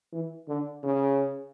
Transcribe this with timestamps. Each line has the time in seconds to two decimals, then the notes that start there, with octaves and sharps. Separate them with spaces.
0.13 E3
0.48 D3
0.83 C#3